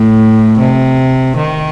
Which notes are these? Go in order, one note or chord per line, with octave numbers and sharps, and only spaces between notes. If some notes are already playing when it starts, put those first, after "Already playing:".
Already playing: A2
C3
D#3